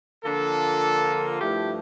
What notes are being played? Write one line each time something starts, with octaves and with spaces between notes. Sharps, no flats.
D3 F3 A#3 D4 F4 A4
G2 F3 A3 E4 G4